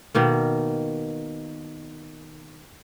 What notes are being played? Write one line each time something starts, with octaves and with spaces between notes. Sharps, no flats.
B2 D#3 A#3